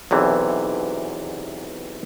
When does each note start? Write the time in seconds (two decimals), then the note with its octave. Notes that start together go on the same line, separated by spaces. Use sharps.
0.11 B1 E2 C3 E3